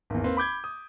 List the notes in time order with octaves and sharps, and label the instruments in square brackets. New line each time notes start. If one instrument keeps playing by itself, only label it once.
[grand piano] G#1 E2
A#3 C4 B4
B5 D6 G6 G#6
D#6